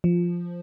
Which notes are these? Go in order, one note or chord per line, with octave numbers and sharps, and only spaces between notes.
F3